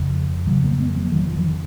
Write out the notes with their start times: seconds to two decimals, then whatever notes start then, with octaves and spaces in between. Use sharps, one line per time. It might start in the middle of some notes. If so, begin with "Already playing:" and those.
Already playing: F2 C#3
0.47 F2 D#3 F#3
0.51 C#3
0.64 F#3 A#3
0.79 G#3 B3
0.96 F#3 A#3
1.12 D#3 F#3
1.28 F3
1.44 D#3